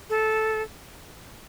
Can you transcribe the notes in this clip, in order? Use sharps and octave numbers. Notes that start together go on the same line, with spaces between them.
A4